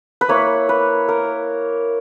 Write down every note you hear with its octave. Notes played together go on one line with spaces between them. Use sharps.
B4
A#3 E4 C#5
B4
A#4